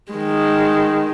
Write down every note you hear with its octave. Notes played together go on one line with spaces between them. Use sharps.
D#3 G#3